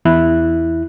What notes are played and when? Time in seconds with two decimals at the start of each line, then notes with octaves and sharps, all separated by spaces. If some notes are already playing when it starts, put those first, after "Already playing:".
0.05 E2 E4 F#6